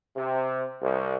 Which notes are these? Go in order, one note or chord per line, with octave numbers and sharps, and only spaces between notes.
C3
C2